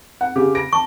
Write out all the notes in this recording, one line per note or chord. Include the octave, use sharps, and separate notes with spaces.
F#5
C#3 G4
A#6 D7
A5 C#6